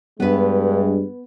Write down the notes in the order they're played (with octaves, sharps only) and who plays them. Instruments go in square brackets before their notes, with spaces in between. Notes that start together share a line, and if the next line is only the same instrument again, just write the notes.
[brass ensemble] G2 G#3 [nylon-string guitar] B3 B4